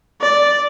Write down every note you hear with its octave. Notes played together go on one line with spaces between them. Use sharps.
D5